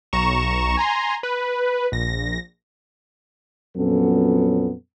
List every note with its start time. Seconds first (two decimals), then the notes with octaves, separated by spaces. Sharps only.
0.13 B1 A#5 C#6 E7
0.77 G#5 A#5 C6
1.23 B4
1.92 A#1 A#6
3.77 F2 A#2 F#3 B3 C#4 A4